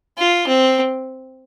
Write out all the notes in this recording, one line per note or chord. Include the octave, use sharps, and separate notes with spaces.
F4
C4